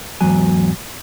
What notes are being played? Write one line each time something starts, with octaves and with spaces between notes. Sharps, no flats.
E2 G#2 F#3 G#5